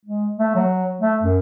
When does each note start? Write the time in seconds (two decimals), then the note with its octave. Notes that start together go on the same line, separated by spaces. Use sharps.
0.05 G#3
0.37 A3
0.55 F#3
1.01 A3
1.22 F#2